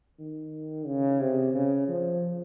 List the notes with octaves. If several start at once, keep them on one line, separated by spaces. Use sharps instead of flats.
D#3
C#3
C3
C#3
F3